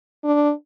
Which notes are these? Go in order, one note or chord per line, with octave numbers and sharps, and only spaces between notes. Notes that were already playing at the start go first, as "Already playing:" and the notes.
D4